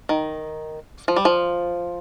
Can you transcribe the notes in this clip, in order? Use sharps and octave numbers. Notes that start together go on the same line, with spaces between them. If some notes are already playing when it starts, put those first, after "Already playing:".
D#3
F3
G3
F3